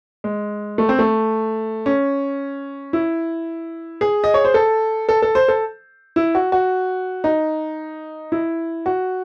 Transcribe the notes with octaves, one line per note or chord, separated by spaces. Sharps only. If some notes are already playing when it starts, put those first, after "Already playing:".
G#3
A3
C4
A3
C#4
E4
G#4
D#5
C#5
C5
A4
A4
A4
C5
A4
E4
F#4
F#4
D#4
E4
F#4